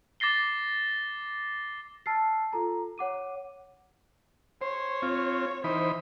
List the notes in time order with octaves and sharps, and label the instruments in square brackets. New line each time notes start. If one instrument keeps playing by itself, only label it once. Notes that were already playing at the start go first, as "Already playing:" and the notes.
[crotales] D6 A6 A#6 C7 G7
[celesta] A5 E6 F6 A6 C7
F4 A4 A#5
C#5 F#5 D6 D#7
[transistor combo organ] C5 [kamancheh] C#5
[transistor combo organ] C4 F4
[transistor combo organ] E3 D#4 B5 [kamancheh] C5